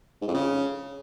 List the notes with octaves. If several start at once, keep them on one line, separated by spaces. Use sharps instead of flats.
G#2
F2
C#3